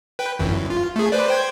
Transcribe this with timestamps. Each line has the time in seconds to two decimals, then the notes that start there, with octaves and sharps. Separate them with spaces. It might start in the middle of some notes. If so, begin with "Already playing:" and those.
0.19 B4 G5
0.39 G1 F#2 E3
0.70 F4
0.96 A3 G#4
1.12 B4 C5 D5
1.28 C5 G5 G#6